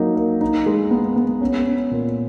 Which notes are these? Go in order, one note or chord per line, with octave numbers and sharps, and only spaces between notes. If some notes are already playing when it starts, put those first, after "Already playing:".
Already playing: F#3 A#3 D#4
A#3
D#4
G#3
B3
B3
C#4
C#4
A#2